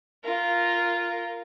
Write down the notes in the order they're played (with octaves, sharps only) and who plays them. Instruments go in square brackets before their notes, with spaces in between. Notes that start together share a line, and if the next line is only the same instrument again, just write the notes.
[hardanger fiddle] F4 A#4